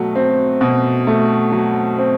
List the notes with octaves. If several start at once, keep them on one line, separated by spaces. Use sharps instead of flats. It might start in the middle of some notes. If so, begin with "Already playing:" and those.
Already playing: B2 F#3 A3
C4
B2
A3
F#3
C4